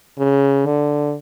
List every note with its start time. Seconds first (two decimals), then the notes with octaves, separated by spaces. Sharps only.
0.19 C#3
0.66 D3